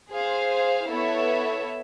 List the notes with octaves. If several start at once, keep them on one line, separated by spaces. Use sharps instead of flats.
G#4 C5 F5
B3 E4 A4 C#5 E5